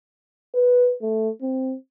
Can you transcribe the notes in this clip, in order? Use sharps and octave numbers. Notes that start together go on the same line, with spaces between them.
B4
A3
C4